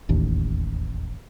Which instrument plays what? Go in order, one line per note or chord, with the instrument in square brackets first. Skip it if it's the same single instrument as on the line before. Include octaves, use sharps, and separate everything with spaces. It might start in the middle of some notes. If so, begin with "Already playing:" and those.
[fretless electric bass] E1 A1 D#2